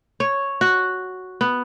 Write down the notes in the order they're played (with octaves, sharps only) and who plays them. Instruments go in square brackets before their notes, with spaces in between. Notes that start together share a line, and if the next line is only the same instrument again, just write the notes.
[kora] C#5
F#4
B3